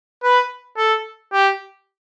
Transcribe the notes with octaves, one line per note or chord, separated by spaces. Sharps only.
B4
A4
G4